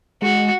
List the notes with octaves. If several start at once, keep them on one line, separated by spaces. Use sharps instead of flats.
G#3 F#4